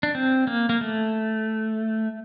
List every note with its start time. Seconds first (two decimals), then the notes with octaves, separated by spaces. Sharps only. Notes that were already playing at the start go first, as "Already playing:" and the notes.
0.03 D4
0.15 C4
0.47 A#3
0.69 A#3
0.81 A3